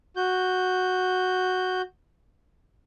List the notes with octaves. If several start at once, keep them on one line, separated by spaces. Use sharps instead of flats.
F#4 G6